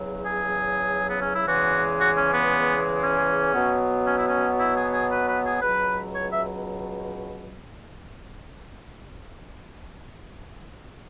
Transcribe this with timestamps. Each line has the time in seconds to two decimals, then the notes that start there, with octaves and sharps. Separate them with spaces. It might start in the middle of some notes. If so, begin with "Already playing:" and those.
Already playing: E2 C#3 F#3
0.24 G#4
1.07 B3
1.19 C#4
1.33 E4
1.45 E2 C#3 E3 G#3 F#4
1.98 F#4
2.15 C#4
2.32 B3
3.00 C#4
3.52 B2 F#3 B3
4.05 C#4
4.15 E4
4.25 C#4
4.57 E4
4.74 G#4
4.92 G#4
5.09 B4
5.26 B4
5.44 G#4
5.61 C#2 B2 F#3 B4
6.13 C#5
6.29 E5